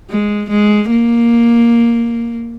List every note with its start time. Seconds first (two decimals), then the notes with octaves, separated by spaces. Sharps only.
0.10 G#3
0.50 G#3
0.91 A#3